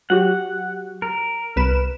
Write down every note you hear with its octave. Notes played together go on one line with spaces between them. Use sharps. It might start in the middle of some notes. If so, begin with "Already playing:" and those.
F#3 F#4 G4 F#5
A#4
C2 B4 E7